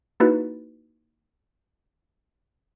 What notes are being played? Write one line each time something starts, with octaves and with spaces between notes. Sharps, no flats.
A#3 D#4 E4 F#4 B4